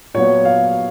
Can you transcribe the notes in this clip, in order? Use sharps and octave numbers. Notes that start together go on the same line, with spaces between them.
A#2 F#3 B3 C#5
F5